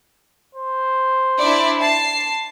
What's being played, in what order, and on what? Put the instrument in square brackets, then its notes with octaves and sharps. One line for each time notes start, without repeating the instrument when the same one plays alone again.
[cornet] C5
[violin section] D4 E4 D5
A5 C7